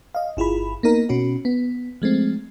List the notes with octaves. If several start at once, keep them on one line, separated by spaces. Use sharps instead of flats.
D#5 F5
G1 E4 F4 G#4 B5
A#3 B3 D#4 A#4
B2 C#4 F#4
B3
F3 G#3 A3 C4